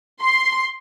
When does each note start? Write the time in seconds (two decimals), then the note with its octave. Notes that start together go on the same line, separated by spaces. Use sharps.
0.21 C6